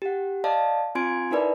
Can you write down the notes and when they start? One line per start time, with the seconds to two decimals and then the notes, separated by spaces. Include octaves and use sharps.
0.02 G4 F#5
0.44 D5 D#5 F5 A5
0.95 C4 F4 G#5 C6 G#6 D7
1.31 D#4 E4 A#4 B4 D5